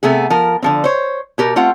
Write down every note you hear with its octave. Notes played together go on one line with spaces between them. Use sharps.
C3 A3 B3 G#4
F3 A#4
D3 F3 C4
C5 C#5
B2 G4 A#4
A3 C4 F4 F#5